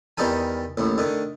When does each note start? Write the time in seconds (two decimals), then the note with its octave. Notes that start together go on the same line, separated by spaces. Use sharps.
0.17 E2 D#3 G3 D#4 A4 G#5
0.77 A1 D#2 A2
0.98 D3 D#3 A3